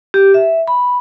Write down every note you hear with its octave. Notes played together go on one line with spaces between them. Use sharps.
G4
E5
B5